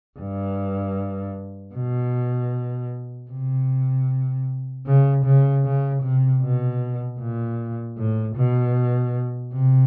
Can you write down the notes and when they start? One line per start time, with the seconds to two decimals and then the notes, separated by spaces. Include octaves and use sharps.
0.19 G2
1.74 B2
3.30 C3
4.86 C#3
5.25 C#3
5.64 C#3
6.02 C3
6.42 B2
7.19 A#2
7.97 A2
8.35 B2
9.53 C3